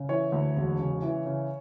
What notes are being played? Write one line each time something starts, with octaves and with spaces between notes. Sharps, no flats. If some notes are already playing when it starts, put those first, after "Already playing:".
Already playing: C#3
E3 C#5
D2
E1
C#3
E3
C#3